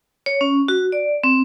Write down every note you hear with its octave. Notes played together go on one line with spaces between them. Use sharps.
C#5
C#4
F#4
D5
C4